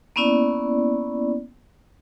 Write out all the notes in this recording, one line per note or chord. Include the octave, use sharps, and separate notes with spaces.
A#3 B3 C#4 E4 D5